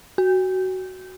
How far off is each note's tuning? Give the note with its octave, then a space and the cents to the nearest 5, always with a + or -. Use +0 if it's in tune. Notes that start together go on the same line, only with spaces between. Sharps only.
F#4 +15